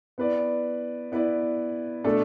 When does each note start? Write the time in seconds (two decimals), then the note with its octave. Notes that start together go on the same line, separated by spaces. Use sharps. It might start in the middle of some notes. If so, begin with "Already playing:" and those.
0.18 B3 E4 B4 D5
1.12 B3 E4 B4 D5
2.04 B2 A3 D4 A4